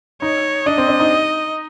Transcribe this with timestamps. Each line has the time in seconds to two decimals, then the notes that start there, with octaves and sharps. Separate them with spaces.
0.22 D#4 C#5
0.66 D4 D#5
0.78 C4
0.88 D4
1.00 D#4